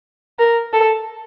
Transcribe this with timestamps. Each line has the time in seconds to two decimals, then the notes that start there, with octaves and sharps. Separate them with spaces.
0.39 A#4
0.73 A4